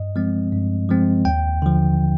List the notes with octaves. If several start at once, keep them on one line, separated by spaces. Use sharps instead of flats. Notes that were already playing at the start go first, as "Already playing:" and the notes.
Already playing: G2 D#5
F3 G#3 C4
G2
F3 G#3 C4
D#2 G5
D3 F3